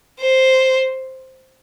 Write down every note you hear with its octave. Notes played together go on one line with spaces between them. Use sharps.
C5